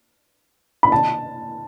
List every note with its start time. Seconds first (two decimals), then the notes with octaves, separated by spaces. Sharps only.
0.83 B5
0.92 A5